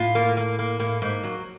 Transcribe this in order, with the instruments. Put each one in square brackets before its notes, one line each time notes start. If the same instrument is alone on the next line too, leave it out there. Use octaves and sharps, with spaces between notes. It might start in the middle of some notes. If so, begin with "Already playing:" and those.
Already playing: [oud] A2 [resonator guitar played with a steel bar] F4
[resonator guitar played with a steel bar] A#3
A#3
A#3
[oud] A2 [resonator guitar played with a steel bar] A#3
[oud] G#2 [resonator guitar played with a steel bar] A#3
[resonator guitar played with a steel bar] F#3